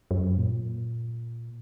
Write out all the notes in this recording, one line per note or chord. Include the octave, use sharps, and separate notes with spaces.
F#2
A#2